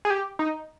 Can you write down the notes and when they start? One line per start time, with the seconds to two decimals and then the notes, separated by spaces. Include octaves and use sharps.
0.05 G#4
0.10 G4
0.39 D#4